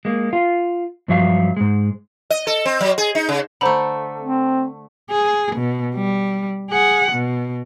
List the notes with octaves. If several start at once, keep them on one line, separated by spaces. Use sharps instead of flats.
G#3 A#3
F4 F5
G2 F3 F#3 E5 F5
G#2 G#3
D#5
A4
C4
F#3
G#4
D#4
C#3
D3 A3 C5 A#5 B5
C4
G#4
B2
G3
G#4 F#5
B2